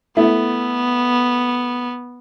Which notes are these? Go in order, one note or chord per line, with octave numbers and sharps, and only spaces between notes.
A3 B3 E4